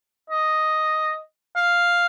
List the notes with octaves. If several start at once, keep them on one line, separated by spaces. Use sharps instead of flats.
D#5
F5